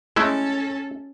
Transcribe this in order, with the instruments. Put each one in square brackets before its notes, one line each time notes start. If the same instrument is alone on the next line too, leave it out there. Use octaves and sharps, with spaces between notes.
[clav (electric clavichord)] G#3 A3 E4 [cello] C#4 A4